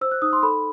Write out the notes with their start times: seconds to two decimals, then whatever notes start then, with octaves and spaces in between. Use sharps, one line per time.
0.01 C5 E6
0.11 F#6
0.22 D#4 D#6
0.33 C6
0.43 A4 B5